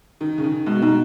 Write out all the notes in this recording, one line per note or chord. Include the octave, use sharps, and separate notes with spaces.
D#3
C#3
D#3
B2 G#3
B2 D#4